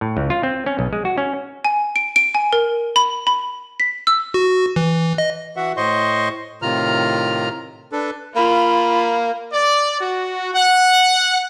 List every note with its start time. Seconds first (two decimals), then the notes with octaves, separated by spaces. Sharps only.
0.01 A2
0.17 C#2
0.30 F4
0.43 C4
0.66 C#4
0.79 B1
0.93 G#3
1.05 F#4
1.18 C#4
1.65 G#5
1.96 D7
2.16 D7
2.35 G#5
2.53 A#4
2.96 B5
3.27 B5
3.80 B6
4.07 E6
4.34 F#4
4.76 E3
5.18 D#5
5.56 E3 F#4 E5 F#5
5.77 A2 C5 D#5 C6 C#6
6.62 A2 C3 D#3 F4 A#5 F6
7.92 D4 A4 B4
8.36 A#3 F4 B5
9.53 D5
10.00 F#4
10.54 F#5